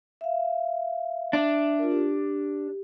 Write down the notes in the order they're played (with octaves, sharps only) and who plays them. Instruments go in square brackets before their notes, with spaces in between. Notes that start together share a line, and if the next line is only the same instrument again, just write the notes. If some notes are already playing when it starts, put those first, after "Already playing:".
[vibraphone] E5 F5
[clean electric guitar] D4 [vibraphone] E5
[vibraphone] F4 A#4
G4